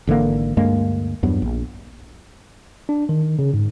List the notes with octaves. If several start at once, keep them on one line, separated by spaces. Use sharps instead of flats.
G#1 D3 E3 A#3
D2 G2 G#3 A#3
E2 G2 F#3 B3
A#1
D4
D#3
C#3
G#2